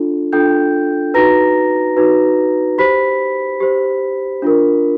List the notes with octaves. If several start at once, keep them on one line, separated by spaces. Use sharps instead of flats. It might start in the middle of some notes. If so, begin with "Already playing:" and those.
Already playing: D4 F4 A4
D4 F4 A4 G5 G6
D#4 F#4 B4 A#5 A#6
D#4 F#4 B4
G4 C5 B5 B6
G4 C5
D4 F4 A#4